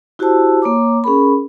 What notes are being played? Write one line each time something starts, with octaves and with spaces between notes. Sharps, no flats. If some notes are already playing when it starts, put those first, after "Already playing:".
E4 F#4 G4 C5 A5 E6
A#3 C#5 A#5 D6
C#4 G#4 A#4 B5